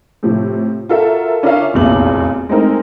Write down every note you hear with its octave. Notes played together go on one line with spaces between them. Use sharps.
A2 C3 F3
F4 F#4 A4 A#4 E5
C#4 D4 F4 A#4 E5 F5
F1 B1 E2 A#2 F#7
G#3 A3 C4 D#4 A#4